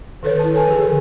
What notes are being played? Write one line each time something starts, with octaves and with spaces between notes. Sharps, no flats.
D#3 A4 B4 C#5
E4 A5
A4 B4 G#5 A5
F3 G#4
D3